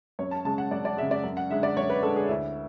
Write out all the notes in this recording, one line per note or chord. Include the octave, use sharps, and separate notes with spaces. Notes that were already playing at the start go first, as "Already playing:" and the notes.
F#2 C#5
A5
C#3 G#3 A5
F#5
F#2 D5
D5
C#3 G#3 E5
D5
F#2
F#5
D3 G#3 E5
D5
F#2 C#5
B4
D3 G#3 A4
G#4
D2 E4